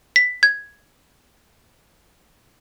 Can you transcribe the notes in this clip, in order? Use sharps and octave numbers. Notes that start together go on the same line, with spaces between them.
B6
G#6